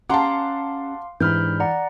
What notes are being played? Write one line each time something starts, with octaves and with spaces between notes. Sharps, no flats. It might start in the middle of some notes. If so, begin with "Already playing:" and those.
C#4 G4 F5 F#5 A5 A#5 C6 D6
G#2 E3 D4 G4 B5 F6 G6
D5 F#5 A#5